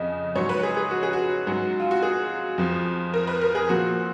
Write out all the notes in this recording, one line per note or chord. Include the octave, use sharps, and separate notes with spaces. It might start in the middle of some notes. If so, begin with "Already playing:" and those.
Already playing: F2 C#3 D#5
G#2 F#3 C#5
B4
G#4
G#4
F#4
G#4
F#4
G#2 F#3
F4
F#4
G#4
F2 F3
A#4
B4
A#4
G#4
A#2 F3 F#4